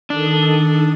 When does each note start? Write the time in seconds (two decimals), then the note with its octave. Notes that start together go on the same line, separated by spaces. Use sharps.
0.10 D#3 D4 A4 D#6